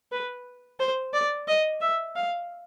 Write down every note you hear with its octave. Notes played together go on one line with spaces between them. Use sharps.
B4
C5
D5
D#5
E5
F5